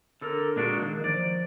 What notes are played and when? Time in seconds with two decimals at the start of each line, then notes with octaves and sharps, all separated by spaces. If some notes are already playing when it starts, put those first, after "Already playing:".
0.21 D3 A4 A#4
0.56 A#2 G#3 D4 F#4
0.77 D#3 A#3
1.04 F3 D5